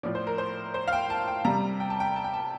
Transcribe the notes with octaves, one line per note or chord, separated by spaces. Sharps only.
A2 F3 D5
C5
A#4
C5
C5
F5
G5
A5
G5
C3 G3 A#5
G5
A5
G5
A5
G5
A5